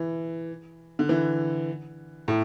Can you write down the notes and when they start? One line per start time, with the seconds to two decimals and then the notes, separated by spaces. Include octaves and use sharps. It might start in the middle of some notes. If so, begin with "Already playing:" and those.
Already playing: E3
0.99 D3
1.09 E3
2.28 A2